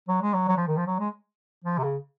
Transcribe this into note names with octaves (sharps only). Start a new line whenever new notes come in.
F#3
G#3
F#3
F#3
F3
D#3
F3
F#3
G#3
F3
C3
C#3